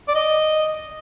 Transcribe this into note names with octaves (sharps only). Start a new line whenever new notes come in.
D5
D#5